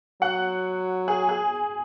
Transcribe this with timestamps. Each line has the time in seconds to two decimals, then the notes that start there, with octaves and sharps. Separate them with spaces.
0.22 F#3 F#5
1.08 G#4
1.29 G#4